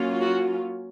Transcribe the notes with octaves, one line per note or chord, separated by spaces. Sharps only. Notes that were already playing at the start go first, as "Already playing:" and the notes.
Already playing: F#3 A#3 C#4 F4
F#4